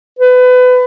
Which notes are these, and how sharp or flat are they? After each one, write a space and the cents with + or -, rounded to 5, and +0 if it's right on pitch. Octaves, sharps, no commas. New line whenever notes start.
B4 +25